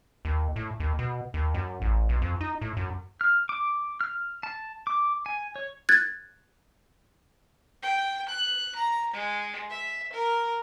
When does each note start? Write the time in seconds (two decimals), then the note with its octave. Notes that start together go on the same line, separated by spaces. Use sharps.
0.25 D#2
0.56 A2
0.80 D#2
0.99 B2
1.34 D#2
1.54 F#2
1.82 A1
2.09 B1
2.22 F2
2.41 D#4
2.61 A2
2.77 F#2
3.21 F6
3.49 D6
4.01 F6
4.43 A5
4.87 D6
5.26 G#5
5.56 C#5
5.89 F#6 G#6 A6
7.83 G5
8.29 F#6
8.75 A#5
9.13 G#3
9.71 E5
10.13 A#4